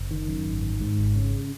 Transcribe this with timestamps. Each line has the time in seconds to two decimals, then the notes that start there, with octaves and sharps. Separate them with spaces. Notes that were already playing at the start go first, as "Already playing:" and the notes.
Already playing: F#1
0.11 D#3
0.28 F#2
0.46 G#1
0.62 D#3
0.81 G#2
0.98 G#1
1.15 C#3